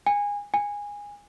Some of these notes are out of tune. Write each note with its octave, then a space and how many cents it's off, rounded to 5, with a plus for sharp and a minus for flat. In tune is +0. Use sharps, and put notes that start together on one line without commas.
G#5 -20
G#5 -15